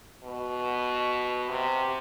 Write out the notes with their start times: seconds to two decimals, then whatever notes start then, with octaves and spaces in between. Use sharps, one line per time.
0.24 B2
1.50 C3